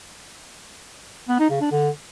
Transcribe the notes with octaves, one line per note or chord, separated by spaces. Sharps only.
B3
D#4
C#3
D4
D3